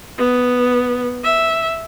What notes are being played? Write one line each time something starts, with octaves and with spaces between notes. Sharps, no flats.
B3
E5